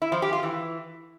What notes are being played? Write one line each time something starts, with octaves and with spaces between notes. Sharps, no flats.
E4
F3
G4
F4
E3